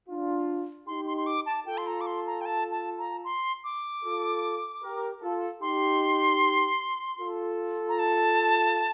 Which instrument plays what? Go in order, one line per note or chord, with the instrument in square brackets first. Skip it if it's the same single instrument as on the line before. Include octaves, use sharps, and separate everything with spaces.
[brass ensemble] D4 F4
[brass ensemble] D#4 G4 [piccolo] C6
[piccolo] C6
C6
D6
A5
[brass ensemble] F4 A4 [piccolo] G5
[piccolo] C6
A#5
D6
C6
A#5
G5
A5
A5
A#5
C6
D6
[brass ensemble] F4 A4
G4 A#4
F4 A4
[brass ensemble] D#4 G4 [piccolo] C6
[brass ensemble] F4 A4
[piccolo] A#5
A5